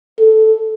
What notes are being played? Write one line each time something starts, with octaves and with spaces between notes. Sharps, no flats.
A4